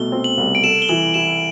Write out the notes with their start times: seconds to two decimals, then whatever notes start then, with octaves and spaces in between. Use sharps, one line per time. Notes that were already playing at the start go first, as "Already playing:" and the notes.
Already playing: C2 B2 A3 G7
0.12 C4
0.24 F#7
0.37 C2
0.55 D7
0.64 A4 E7
0.82 G7
0.89 E3 F#7
1.14 E4 E7